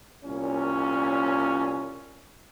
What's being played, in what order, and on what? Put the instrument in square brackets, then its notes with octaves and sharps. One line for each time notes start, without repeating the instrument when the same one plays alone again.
[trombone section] C2 A#2 C#4